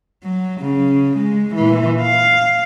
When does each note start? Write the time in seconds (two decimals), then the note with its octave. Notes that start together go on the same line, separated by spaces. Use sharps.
0.23 F#3
0.61 C#3
1.17 G#3
1.55 A#2 E3
2.01 F5